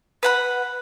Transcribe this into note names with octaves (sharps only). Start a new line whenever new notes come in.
B4 F#5 B5